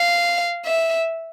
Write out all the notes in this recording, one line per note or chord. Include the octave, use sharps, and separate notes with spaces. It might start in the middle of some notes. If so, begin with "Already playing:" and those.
Already playing: F5
E5